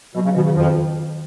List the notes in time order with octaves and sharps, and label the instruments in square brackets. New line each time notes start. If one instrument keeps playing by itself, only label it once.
[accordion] B2 [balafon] F#3
[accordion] C#3
[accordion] B2 [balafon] D#3
[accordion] C#3
[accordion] F2 F3 [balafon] D#3